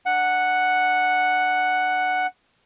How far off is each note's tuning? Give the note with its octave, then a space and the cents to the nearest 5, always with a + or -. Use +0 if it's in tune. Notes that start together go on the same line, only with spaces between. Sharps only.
D4 +25 F#5 +0